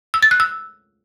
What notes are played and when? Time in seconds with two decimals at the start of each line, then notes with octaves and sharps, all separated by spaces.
0.14 E6
0.23 A6
0.31 F#6
0.40 E6